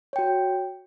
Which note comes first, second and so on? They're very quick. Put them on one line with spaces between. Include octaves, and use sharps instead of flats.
C#5 G5 F#4